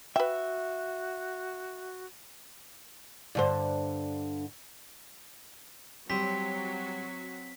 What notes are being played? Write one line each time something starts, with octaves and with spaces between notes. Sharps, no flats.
F#4 B4 E5 G5
G2 D3 C5
F#3 G3 C4 F#4 B6